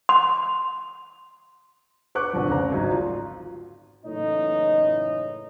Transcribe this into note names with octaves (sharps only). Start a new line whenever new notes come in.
C6
B4 F#5 C#6 D6 F#6
C2 D3 F3
F1 C#3 C4 A#5
G#1 D2 F#3 D#4
F4
F#1 A2 E3 D#4 C#5 D#5